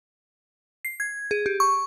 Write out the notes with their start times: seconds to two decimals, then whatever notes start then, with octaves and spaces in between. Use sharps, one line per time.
0.85 C7
1.00 G#6
1.31 G#4
1.46 G4
1.60 C#6